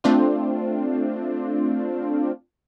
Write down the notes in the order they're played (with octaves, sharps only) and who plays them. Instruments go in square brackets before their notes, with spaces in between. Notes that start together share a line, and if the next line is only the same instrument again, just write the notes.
[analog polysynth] A3 C4 D4 F4